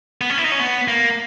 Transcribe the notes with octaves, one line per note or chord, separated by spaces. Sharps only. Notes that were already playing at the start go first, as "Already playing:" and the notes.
B3
C#4
E4
D#4
C#4
B3
A#3